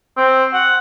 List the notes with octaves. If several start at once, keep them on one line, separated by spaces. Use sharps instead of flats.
C4
F#5